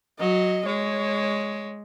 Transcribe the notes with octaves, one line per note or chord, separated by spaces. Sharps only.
F#3 D#5
G#3 C#5